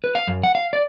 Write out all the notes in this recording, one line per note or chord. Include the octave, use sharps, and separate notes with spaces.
B4
F5
F#2
F#5
F5
D5